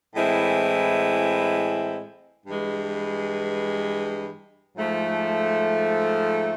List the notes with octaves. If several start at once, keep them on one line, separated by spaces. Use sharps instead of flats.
A2 E3 G#3 C4 E4
G2 E3 G#3
G#2 F3 A3